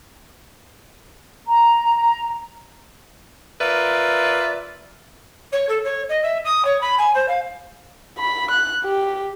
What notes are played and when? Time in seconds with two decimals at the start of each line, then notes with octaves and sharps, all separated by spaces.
1.47 A#5
3.61 F4 A#4 B4 D5 E5
5.52 C#5
5.68 A4
5.84 C#5
6.09 D#5
6.22 E5
6.44 D#6
6.64 C#5
6.81 B5
6.98 G#5
7.14 C5
7.28 F5
8.18 B5
8.51 F#6
8.84 G4